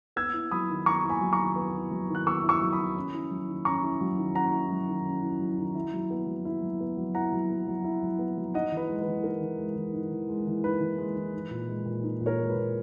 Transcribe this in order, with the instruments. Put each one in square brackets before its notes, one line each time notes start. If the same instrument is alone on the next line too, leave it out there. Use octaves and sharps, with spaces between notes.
[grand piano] B3 E6 G#6
E4
F#3 B5 D#6
D#3
B3 A#5 C#6
E4
G#5 B5
F#3
A#5 C#6
D#3
B3
E4
F#3
D#3
F#6
B3 C#6 E6
E4
C#6 E6
F#3
B5 D#6
D#3
C#4
E4
F#3
D#3
C#4 A#5 C#6
E4
F#3
D#3
C#4 F#5 A#5
E4
F#3
D#3
C#4
E4
F#3
D#3
E4
F#3
B3
F#3
E4
F#3
B3
F#3
E4 F#5 A#5
F#3
B3
F#3
E4
F#3
B3
F#3
D#4 D#5 F#5
E3
B4 D#5
G#3
B4
E3
D#4 A#4
E3
G#3
E3
D#4
E3
G#3
E3
D#4 B4
E3
G#3
E3
D#4
A#2
G#3
A#2
D#4
A#2
A#4 C#5
G#3
B4
A#2